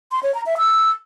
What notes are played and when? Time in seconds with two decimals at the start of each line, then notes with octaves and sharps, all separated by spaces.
0.12 C6
0.23 C#5
0.35 A#5
0.46 E5
0.58 E6